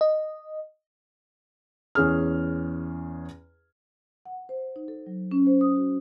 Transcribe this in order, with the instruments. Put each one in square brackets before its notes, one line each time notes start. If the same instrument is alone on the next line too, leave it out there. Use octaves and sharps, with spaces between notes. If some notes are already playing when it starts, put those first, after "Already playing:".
[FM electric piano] D#5
[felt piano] E2 C#4 G#4 F6
[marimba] F#5
C5
D#4
A4
F#3
C#4
C5
D#6
F#4